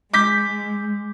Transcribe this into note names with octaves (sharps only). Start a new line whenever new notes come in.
G#3 D6 G6 B6